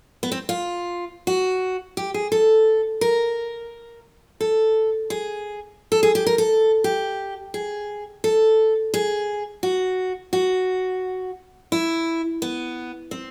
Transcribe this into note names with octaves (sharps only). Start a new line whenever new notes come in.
B3
C4
F4
F#4
G4
G#4
A4
A#4
A4
G#4
A4
G#4
G4
A#4
A4
G4
G#4
A4
G#4
F#4
F#4
E4
B3
C4